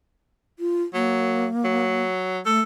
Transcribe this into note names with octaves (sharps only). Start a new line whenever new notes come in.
F4
F#3 A#3
F#3
A3 A4